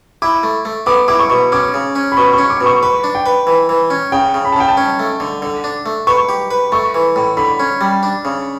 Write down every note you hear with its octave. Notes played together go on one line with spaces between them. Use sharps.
E4 D6
A3
A3
B3 D6
E4 D6
C#6
B2
C#4 D6
C#3
C#4
B5
B2 C#6
C#6
C#4
D6
B2
C#6
B4 C#6
D4
G5
B4
E3
E3
C#4
C#3 G5
C#3
B5
A5
C#3 G5
A5
C#4
A3
D3
D3
D4
A3
B4 C#6
G4
B4
A3 C#6
E3
A2
D3 B5
C#4
G3
D4
C#3